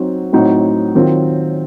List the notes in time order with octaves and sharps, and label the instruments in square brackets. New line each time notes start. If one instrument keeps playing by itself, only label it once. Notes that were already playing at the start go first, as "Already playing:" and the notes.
Already playing: [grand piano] F#3 C4 D#4 F#4
A2 F#3 C4 D#4 F#4
D#3 F#3 C4 F4